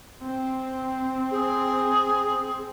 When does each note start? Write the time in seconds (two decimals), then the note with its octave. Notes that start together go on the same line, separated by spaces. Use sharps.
0.24 C4
1.31 G#4